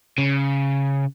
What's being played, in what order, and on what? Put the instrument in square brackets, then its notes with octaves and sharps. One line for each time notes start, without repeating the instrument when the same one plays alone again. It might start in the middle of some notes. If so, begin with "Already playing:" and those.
[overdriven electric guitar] C#3